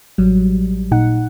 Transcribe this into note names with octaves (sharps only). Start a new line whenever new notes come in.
A1 F#3 G3
A#2 D#4 F#5